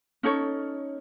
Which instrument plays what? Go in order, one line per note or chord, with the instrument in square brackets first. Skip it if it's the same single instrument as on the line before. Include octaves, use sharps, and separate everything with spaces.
[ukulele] C#4 D#4 A4 C#5